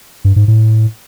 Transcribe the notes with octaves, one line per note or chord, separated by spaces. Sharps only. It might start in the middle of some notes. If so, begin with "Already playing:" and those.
G2
G#2
A2